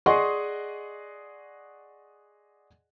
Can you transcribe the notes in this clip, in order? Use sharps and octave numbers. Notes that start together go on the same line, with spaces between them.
G#4 D5 D#5 F#5 C6 C#6